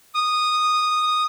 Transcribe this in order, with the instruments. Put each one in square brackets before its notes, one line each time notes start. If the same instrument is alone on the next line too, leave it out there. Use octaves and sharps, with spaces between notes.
[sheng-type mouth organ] D#6